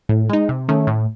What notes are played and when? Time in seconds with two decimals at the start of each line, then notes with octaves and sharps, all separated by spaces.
0.09 A2
0.29 G#3 D#4
0.49 C3
0.69 D#3 A3 C#4
0.87 A2